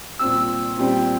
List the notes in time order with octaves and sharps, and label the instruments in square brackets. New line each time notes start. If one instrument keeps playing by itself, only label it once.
[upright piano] A#2 G3 C4 G4 [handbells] E6
[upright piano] A#2 G3 C4 G4